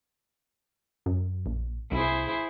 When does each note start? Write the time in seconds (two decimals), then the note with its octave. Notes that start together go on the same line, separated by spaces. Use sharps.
1.06 F#2
1.46 A#1
1.92 C2 E4 G#4 C5